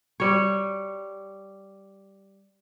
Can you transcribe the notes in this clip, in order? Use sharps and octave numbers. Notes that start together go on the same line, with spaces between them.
G3 C#5